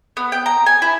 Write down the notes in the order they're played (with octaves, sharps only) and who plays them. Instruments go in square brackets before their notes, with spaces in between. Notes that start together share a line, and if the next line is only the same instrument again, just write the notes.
[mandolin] B3
G5
A#5
G#5
E4